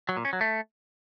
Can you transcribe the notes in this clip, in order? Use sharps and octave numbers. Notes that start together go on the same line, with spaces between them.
F#3
A#2
C#4
F#3
A3